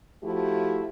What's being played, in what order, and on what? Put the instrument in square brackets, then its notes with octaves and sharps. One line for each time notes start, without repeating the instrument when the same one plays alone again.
[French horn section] F3 A3 E4 F#4 G4